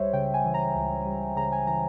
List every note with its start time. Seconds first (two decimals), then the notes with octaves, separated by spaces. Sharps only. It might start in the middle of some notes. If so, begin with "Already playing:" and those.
Already playing: C#2 G3 C5 C#5 E5
0.13 C#3 G5
0.34 G#5
0.45 E3
0.54 A#5
0.75 C#2
1.05 G3
1.36 C#3 A#5
1.52 G#5
1.67 E3 A#5